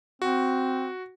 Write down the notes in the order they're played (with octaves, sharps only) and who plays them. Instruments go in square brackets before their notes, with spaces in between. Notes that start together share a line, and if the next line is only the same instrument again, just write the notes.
[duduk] C4 [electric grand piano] F#4